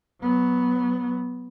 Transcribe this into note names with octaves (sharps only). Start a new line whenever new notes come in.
F#3 B3